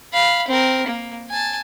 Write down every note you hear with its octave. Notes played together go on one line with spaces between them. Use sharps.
F5 B5
C4 A#4
A#3
G#5 A5